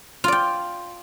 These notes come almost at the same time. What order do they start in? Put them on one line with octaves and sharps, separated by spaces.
F4 D5 G5